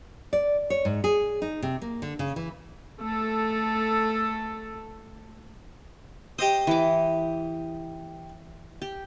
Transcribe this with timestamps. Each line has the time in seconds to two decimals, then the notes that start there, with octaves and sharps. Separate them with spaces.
0.33 D5
0.70 C#5
0.85 G#2
1.04 G#4
1.42 D#4
1.63 C3
1.82 A#3
2.02 D3
2.19 C#3
2.36 E3
3.00 A3 A4
6.39 G4 C5 D#5 D#6
6.67 E3 D6
8.82 G4